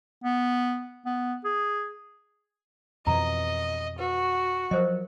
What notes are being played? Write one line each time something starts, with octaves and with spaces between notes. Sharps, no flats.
B3
B3
G#4
F2 B2 E3 D#5 A#5
F#4 B4
F3 F#3 A#4 C5 D#5